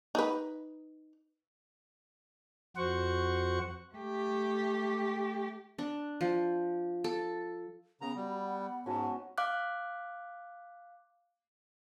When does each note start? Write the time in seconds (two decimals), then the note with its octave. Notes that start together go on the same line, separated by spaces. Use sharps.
0.15 D#4 B4
2.77 F2 F#4 C5 F#5 C#6
3.95 A3 G4
5.78 D4
6.21 F3
7.04 A4
8.01 C#3 B3 C#4 A#5
8.16 G3 F#4
8.46 F#5
8.86 G#2 C#4 F#4 D#5 A5
9.38 F5 D6 F#6